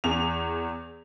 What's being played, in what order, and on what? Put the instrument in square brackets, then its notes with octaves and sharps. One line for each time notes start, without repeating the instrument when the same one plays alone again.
[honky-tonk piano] E2 G#4 F7